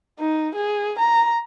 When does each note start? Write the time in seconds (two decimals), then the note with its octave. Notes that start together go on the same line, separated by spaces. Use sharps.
0.19 D#4
0.55 G#4
0.99 A#5